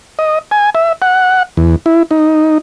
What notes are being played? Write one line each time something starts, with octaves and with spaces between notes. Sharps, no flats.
D#5
G#5
E5
F#5
E2
E4
D#4